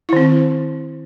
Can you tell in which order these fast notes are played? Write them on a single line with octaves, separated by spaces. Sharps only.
E4 D#3 C4